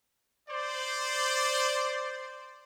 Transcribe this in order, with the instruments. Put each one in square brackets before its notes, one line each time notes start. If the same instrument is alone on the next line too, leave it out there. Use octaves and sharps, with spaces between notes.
[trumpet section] C5 D5